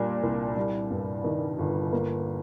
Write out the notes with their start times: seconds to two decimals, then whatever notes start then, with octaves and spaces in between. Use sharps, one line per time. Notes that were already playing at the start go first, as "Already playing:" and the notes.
Already playing: A#2 G3 D4
0.23 C2
0.56 G3
0.91 G2
1.24 D#3
1.59 G1
1.93 A#3